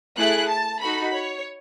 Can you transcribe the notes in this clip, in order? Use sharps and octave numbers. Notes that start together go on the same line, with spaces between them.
A3 E4 G#4 F#6
A5
D#4 F#4 A4 B5
C#5